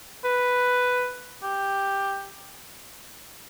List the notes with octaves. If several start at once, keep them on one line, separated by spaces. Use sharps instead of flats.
B4
G4